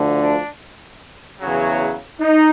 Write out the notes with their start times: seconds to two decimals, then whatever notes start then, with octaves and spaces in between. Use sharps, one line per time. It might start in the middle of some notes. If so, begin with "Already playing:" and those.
Already playing: D2 D3 F3
0.22 D4
1.41 E2 C#3 F#3
2.20 D#4